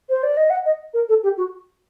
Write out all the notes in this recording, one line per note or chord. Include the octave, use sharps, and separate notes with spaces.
C5
D5
D#5
F#5
D#5
A#4
A4
G4
F#4